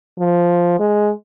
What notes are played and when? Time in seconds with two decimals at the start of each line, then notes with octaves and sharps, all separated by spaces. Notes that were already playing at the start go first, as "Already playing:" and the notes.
0.19 F3
0.80 G#3